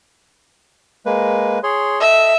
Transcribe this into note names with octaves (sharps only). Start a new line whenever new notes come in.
G#3 A#3 B4
G#4 C#5 C6
A4 D#5 E5